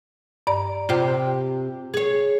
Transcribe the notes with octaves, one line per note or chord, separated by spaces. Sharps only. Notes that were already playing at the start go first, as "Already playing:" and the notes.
G2 D5 A#5
C3 F4 G4 C5
G#4 C#5